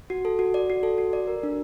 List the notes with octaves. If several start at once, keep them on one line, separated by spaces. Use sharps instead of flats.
F#4
A4
F#4
D5
F#4
A4
F#4
D5
A#4
D4